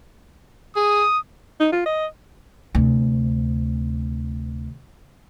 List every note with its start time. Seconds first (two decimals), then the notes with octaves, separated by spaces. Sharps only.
0.76 G#4 D#6
1.60 D#4
1.72 F4
1.86 D#5
2.75 D2 C3